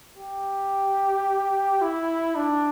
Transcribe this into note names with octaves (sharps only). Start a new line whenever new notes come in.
G4
E4
D4